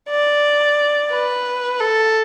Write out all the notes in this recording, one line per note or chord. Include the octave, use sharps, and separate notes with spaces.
D5
B4
A4